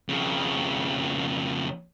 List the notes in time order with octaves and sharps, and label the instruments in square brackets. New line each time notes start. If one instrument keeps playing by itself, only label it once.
[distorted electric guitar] F2 C#3